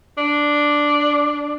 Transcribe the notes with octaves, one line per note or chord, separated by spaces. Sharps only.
D4